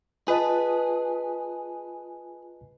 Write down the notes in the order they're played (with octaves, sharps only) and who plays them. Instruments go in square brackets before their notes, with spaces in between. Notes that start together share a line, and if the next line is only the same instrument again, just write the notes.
[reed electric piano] F4 D#5 A5 [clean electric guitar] G#4 [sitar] B4